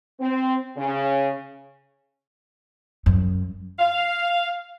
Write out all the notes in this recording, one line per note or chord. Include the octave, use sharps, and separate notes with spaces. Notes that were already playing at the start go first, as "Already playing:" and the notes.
C4
C#3
F#2
F5